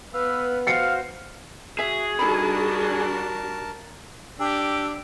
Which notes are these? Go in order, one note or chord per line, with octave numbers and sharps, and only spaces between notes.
B3 B4 F5 E6
F#4 C5 F5 C7 C#7
F#4 G#4 E5
G3 D4 D#4 F#4 A4 A#4 A5 B5
D4 G4 E6